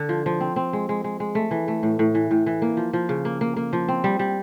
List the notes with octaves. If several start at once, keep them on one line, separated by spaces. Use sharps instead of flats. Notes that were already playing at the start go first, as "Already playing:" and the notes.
Already playing: D3
F3
F3
C4
C4
G#3
G#3
G#3
G#3
A3
E3
A3
A2
A2
E3
A2
E3
A#3
F3
F3
C#3
A#3
A#3
A#3
F3
C4
G3
G3